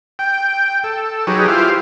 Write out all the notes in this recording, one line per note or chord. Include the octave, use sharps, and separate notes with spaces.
G5
A4
F#3 D#4 G4 G#4 B4 C#5
E4 F4 G4 C5 F5